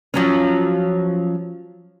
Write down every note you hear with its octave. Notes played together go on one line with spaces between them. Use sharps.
F3 F#3 C#4